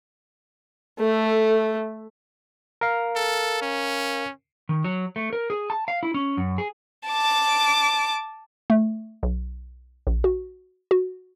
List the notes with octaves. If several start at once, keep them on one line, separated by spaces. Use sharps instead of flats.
A3 A4
A#4 F5
A4
C#4
D#3
F#3
A3
A#4
G#4
A5
F5
E4
C#4
F#2
G#4
A5 D6
A3
B1
A#1
F#4
F#4